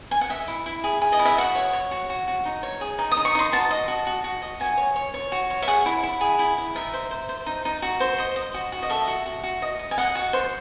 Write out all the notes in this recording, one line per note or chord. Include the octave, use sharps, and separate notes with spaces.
G#5
F#5
D#5 E5
E4
E4
G#4
G#4
D#5
E4
E5
F#4 F#5
C#5
C#5
F#4
F#4
F#4
D#4
C#5
G#4
D#4
D#6
D#4
C#6
D#4 C6
F#4 A5
D#5
F#4
F#4
F#4
D#5
F#4 G#5
C#5
C#5
C#5
F#4
C#5
E5
G#4 F#5
E4
E4
G#4
E4
E4
D#4 E5
C5
C5
C5
D#4
D#4
F#4
C5
D#5
D#5
F#4
F#4
D#5
A4 E5
F#4
F#4
F#4
D#5
D#5
G#5
D#5 F#5
F#4
C5